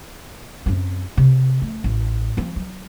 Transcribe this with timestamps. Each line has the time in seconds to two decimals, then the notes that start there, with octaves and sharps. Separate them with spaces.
0.66 F#2 C4
1.17 C3
1.62 A3
1.84 A1
2.37 F3 C4
2.56 F#3